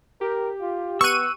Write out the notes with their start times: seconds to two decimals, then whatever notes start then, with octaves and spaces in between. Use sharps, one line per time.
0.21 G4 A#4
0.61 F4
1.01 B3 C#6 E6 F#6 D#7